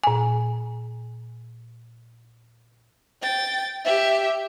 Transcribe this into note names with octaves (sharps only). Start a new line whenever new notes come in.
A#2 G#5
G5 A6
G4 E5